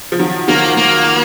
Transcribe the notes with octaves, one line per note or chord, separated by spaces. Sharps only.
F3
D#3 F#3
D#3 F#3 A#3
A#3